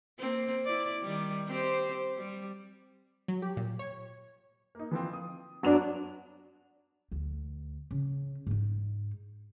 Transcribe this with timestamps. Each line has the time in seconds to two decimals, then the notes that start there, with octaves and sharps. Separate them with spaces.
0.19 A#3 C4
0.66 E4 D5
1.03 D#3 G3
1.48 C4 G4 C5
2.18 G3
3.28 F#3
3.42 G4
3.57 A#2
3.79 C#5
4.75 A#3 D#4
4.91 E3 F3 C4
5.13 D#6
5.63 F#2 F#3 B3 D4 F7
7.12 D2
7.91 C#3
8.47 G#2 D#4